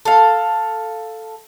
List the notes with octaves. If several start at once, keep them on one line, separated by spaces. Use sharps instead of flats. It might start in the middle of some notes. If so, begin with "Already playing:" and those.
A4 F5